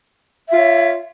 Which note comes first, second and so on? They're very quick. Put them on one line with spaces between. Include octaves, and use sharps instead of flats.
E5 F4 C#5